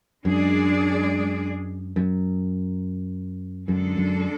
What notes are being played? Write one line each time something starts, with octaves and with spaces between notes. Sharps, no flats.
F#2 G#3 D4 G#4 D5
F#2
F#2 D3 G#3 D4 A4
F#2